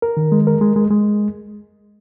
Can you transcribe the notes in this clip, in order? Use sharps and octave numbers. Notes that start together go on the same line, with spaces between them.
A#4
D#3
G#3
A#4
G#3
G#3
G#3